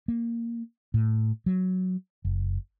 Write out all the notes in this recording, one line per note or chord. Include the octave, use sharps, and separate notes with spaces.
A#3
A2
F#3
F#1